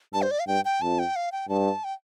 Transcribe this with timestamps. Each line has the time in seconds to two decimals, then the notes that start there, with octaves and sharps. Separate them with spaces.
0.13 G2 A5
0.22 C5
0.31 D5
0.40 F5
0.47 G2 G5
0.65 G5
0.82 F2 A5
0.99 G5
1.16 F5
1.32 G5
1.49 G2 A5
1.84 G5